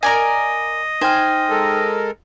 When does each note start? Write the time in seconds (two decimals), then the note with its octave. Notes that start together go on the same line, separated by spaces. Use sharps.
0.03 A#4 D5 D#5 G#5
1.01 D#4 C5 G5 G#5 F6
1.50 G#3 A4 A#4